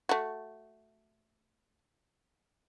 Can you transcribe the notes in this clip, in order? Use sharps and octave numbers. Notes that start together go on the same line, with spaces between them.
A3 F#4